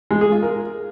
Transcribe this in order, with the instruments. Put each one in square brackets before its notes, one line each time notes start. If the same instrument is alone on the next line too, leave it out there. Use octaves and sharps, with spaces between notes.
[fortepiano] G#3
G#4
F4
A#4